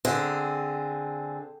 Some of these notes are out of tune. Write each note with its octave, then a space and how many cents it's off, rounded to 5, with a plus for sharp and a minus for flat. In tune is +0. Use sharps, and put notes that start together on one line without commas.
D3 +0 C4 +0 G#4 -5